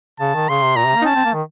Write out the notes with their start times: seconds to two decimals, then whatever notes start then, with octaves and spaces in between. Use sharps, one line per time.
0.20 C#3 A5
0.34 D#3
0.49 C#3 C6
0.63 C3
0.76 A#2 A#5
0.86 C3
0.96 A#3
1.02 D#4
1.05 C#4 A5
1.15 C4
1.25 A#3
1.33 D#3